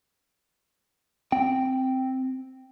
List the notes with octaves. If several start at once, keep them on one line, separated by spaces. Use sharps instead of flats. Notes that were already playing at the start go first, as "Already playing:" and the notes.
C4 G5